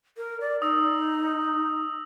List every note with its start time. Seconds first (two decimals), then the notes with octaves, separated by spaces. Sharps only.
0.17 A#4
0.40 D5
0.62 D#4 D#6 E6 A#6